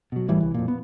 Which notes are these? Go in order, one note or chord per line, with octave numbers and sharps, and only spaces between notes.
B2 F#3
G#1 A2 E3 G3
C2 E3
F2 A#2
B3